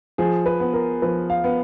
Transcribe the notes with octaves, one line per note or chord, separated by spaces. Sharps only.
F3 G#4
B4
B3
A#4
F3 B4
F5
B3